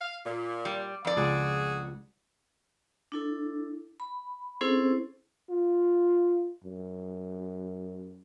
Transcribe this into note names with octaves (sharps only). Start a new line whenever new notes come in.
F5
A#2
G3
F2 D5
C#2 F#4 G#4
D4 E4 A4
B5
C4 C#4 E4 G#4 A4 C5
F4
F#2